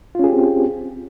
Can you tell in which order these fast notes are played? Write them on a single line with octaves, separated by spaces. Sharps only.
F4 C#4 G#4 G4 C4